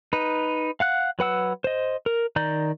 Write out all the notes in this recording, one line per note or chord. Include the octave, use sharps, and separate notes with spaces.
D#4 B4
F5 F#5 F#6
F#3 B4 F#5 E6
C5 D#5
A#4
D#3 D5 A#5 G6